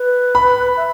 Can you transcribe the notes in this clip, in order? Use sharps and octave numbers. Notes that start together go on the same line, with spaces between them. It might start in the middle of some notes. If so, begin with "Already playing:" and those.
Already playing: B4
B5
E5